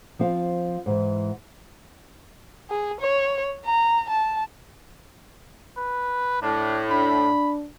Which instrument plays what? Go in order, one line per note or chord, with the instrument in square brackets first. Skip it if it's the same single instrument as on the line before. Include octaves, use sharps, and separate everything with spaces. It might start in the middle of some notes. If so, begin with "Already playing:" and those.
[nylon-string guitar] F3 C4 F5
G#2 E3
[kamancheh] G#4
C#5
A#5
A5
[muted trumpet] B4
[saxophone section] A2 [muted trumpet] D4
[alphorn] D4 [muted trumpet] B5